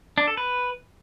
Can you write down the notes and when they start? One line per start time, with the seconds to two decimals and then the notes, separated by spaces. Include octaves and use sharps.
0.18 D4
0.27 A4
0.37 B4